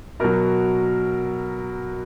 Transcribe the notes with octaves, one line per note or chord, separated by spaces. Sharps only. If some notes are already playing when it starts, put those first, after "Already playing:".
B2 F#3 A#4